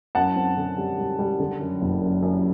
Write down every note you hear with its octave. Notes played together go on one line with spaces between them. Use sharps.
F#2 F#5 A5
C4
D3
G3
G3
G3
D3
F#2
F#1
F#2
F#2